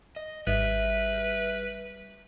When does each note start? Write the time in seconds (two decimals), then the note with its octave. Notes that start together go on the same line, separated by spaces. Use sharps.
0.16 D#5
0.47 G#1 G3 B4 E5